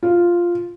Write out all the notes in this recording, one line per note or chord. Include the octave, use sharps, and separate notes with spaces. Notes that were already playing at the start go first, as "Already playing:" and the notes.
F4